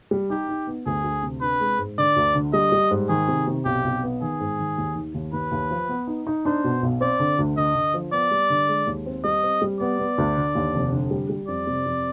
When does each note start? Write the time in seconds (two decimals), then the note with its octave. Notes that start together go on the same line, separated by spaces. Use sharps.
0.11 G3
0.30 D#4 G4
0.49 D#4
0.67 B3
0.86 D2 G#4
1.04 D2
1.23 C3
1.41 D4 B4
1.60 G#3
1.79 G#2
1.98 D3 D5
2.16 D2
2.35 D3
2.53 G3 D#5
2.72 G3
2.91 G#2
3.09 D#3 G#4
3.28 C3
3.47 C3
3.65 B1 G4
3.84 B1
4.03 B3
4.21 D#3 G#4
4.40 G#2
4.59 D#3
4.77 D#2
4.96 D#3
5.15 D#2
5.33 D#2 B4
5.52 D#2
5.70 F3
5.89 B3
6.07 D#4
6.27 D#4
6.45 D4 C5
6.64 B2
6.82 B1
7.01 C4 D5
7.20 D3
7.38 D2
7.57 D3 D#5
7.75 D3
7.94 F3
8.13 B3 D5
8.31 G3
8.50 D3
8.69 G#3
8.87 D#2
9.06 C4
9.24 G3 D#5
9.43 C4
9.62 G3
9.80 B3 D5
9.99 B3
10.18 D2
10.37 D3
10.55 D#2
10.74 F1
10.92 D3
11.11 G3
11.30 G3
11.48 F2 D5
11.67 C3
11.86 F2